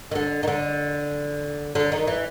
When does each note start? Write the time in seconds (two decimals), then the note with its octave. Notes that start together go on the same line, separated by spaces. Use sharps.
0.11 D#3
0.15 D3
0.43 D#3
0.48 D3
1.75 D3
1.92 D#3
2.07 E3